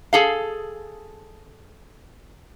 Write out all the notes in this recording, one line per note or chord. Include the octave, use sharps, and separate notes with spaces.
G#4 A4 F5